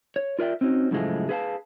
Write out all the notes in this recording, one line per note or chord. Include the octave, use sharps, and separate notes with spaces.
C#5
F4 A#4 D5 E5 G5
C4 C#4 D#4 F#4
F#2 A2 C#3 F3 G#3 A3
G#4 B4 F5 A5